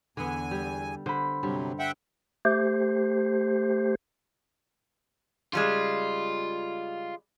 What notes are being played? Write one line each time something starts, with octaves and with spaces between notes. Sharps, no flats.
E2 D3 B3 G#5
G3
D3 C5 B5
G2 C3 F#3 G3
E5 F#5 G5
A3 G4 C5
C#3 G3 G#3 F4